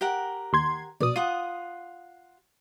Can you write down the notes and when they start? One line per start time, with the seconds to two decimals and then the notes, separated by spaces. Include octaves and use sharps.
0.01 G4 A#4 F#5
0.53 D#2 C6 G#6
1.00 A#1 B2 D5 D#6
1.16 F4 F#5 D#6